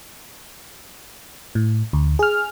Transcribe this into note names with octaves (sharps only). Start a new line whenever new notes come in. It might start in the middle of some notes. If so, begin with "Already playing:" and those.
A2
D2
G#4 F6